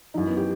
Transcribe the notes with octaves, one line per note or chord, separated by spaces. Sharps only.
F#2 E3 D#4
B3
G4